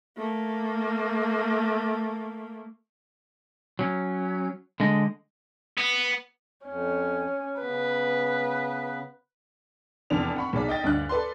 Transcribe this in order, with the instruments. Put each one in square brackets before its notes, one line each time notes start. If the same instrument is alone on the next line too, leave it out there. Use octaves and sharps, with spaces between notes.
[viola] A3 A#3
[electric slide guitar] F#3 C#4
D3 G#3 D#5
[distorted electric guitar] B3
[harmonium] F2 [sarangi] C#4
[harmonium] C#3 B3 [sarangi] B4
[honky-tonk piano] F1 E2 D4 F7
F#5 B5 C#6
B1 G#4 D5 B6
D#5 G5 A6
D2 G2 D5 F#6
A4 B4 D5 C6